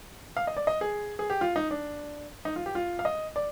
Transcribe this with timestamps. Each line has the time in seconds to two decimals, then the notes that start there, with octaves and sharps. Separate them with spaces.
0.37 F5
0.47 D#5
0.57 D5
0.67 D#5
0.81 G#4
1.19 G#4
1.30 G4
1.41 F4
1.56 D#4
1.71 D4
2.45 D#4
2.56 F4
2.66 G4
2.75 F4
2.99 F5
3.05 D#5
3.36 D5